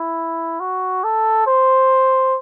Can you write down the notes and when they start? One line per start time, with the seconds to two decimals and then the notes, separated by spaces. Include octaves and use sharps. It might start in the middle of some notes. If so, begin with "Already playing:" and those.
Already playing: E4
0.60 F#4
1.04 A4
1.47 C5